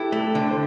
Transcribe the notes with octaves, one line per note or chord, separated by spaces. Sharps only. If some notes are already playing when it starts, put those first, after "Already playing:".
Already playing: E4 G4 A4 B4
A3
A4
D3
C5